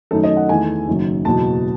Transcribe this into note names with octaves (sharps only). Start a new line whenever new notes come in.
F#2 D#3 A3 D#4 A4
D#5
F#5
E2 D#3 A3 G#5
F#1 F#2 D#3 F#3
F#1 E2 B2 F#3 A5